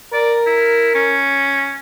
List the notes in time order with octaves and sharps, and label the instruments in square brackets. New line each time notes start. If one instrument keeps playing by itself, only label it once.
[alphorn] A#4 [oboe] D5
[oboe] E4
C#4